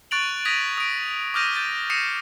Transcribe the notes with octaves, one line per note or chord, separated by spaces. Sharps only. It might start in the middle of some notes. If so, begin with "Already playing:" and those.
C#6 F#6 A6 D7 F7 F#7
D#6 G#6 A#6 B6 D#7 F7
D#6 D7
D6 D#6 F6 G6 A#6 D#7
G6 A6 D#7
D#6 A#6 C7 C#7 D#7 E7